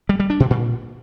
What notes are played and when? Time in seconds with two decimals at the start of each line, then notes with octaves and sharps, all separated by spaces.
0.09 G3
0.20 G3
0.30 D4
0.40 B2
0.50 A#2